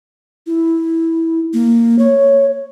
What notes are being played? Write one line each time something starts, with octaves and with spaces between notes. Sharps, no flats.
E4
A#3
C#5